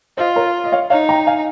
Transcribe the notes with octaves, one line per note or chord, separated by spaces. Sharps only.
F4 C5 D#5
A#4 C#5
D#5
C#5 F5
D#4 C#5 F5
G5 A#5
F5 G#5